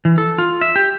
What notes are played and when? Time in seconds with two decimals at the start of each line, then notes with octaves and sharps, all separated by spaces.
0.05 E3
0.18 A4
0.38 F4
0.61 E5
0.76 G4